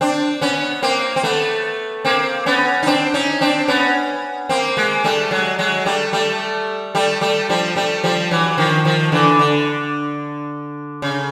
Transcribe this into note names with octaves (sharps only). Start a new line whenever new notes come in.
C4 D4
B3 C#4
A#3 C4
C4
A3 B3
A#3 C4
B3 C#4
D#4
C4 D4
C#4 D#4
C4 D4
B3 C#4
A#3 C4
G#3 A#3
G3 A3
F#3 G#3
F#3 G#3
G3 A3
G3 A3
G3 A3
G3 A3
F3 G3
G3 A3
F3 G3
E3 F#3
D#3 F3
D#3 F3
D3 E3
D3
C#3